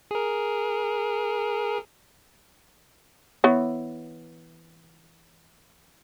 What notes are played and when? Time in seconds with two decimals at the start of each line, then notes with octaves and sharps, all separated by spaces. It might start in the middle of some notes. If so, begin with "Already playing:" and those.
0.11 G#4 A#4
3.44 E3 B3 C#5